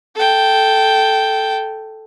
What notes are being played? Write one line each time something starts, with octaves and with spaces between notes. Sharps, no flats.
A4 G5